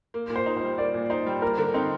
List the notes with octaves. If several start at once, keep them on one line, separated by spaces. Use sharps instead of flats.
A#3
A#2
C5
D#4
C5
G3
A#3 D5
A#2
D#4 C5
G3
A#3 A#4
D3
C4 D#4